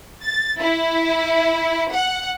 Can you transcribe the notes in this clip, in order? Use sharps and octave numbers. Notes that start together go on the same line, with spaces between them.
A6
E4
F#5